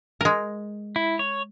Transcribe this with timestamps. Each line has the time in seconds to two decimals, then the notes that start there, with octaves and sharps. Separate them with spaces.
0.21 G#3 A#4
0.96 E4
1.19 C#5